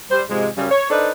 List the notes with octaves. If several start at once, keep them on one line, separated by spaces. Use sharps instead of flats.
G3 C5
G#2 C3 F3 G#3
F#2 C#3 G3
C#5
D4 D#4 A4 B4 C5 D5